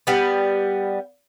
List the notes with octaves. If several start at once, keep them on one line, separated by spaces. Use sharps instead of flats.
G3 B3